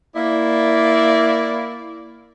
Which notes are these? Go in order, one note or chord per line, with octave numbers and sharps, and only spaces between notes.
A#3 E4 D5